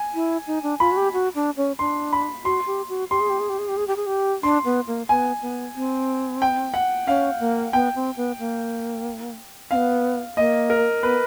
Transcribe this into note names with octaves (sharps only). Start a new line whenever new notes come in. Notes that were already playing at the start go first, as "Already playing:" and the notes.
Already playing: G#5
E4
D#4
D4
F4 B5
F#4
G4
F#4
D4
C#4
D4 C6
B5
F#4 C6
G4
F#4
G4 C6
G#4
G4
G#4
G4
G#4
G4
G#4
G4
G#4
G4
D4 C6
B3
A#3
B3 G#5
B3
C4
G5
F#5
C#4 F5
A#3
B3 G5
C4
B3
A#3
C4 F5
B3
A#3 D#5
A#4
B3 B4